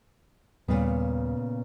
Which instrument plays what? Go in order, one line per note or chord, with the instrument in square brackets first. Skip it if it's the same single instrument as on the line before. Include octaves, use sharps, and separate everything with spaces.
[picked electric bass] D#2 G3 [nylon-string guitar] A#2 C#3 B3